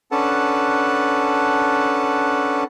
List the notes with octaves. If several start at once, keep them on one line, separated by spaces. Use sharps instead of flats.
C#4 D4 A4 B4 F#5 A5